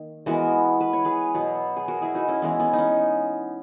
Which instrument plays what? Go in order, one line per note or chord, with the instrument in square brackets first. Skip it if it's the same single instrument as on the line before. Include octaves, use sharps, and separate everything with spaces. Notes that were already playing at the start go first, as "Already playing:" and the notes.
Already playing: [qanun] D#3 A#3
E3 G#3 B3 F#4 A#4
B4
C#5
G#4 B4
B2 F#3 B3
G#4
F#4 A#4
E4 G#4
D#4 F#4
C#4 E4
E3 G#3 B3
B3
D#4
C#4